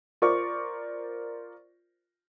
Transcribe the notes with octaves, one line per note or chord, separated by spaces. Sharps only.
F4 A#4 C5 D5 C#6 D6